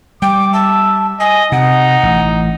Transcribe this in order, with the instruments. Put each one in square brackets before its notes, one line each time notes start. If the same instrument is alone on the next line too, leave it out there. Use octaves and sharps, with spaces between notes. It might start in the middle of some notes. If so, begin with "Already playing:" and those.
[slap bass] G3 [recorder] G5 [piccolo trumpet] D6
[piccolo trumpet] E5 [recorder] A5
[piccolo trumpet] D#5 [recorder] G#5
[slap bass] C3 [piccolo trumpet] D#4 [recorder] F#5
[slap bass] A1